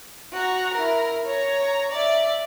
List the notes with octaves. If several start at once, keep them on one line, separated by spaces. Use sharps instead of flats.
F#4 A#5
E4 A#4
C#5 A#5
D5 E5